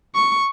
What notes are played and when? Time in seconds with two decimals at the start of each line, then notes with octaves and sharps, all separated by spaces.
0.15 C#6